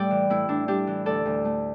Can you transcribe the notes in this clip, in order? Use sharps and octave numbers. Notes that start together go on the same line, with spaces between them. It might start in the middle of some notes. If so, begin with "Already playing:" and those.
Already playing: A2 G3 D5 G5
E3
A2 E4
A2 D4
G3 D4 G4
E3
D2 A4 D5
D2
A3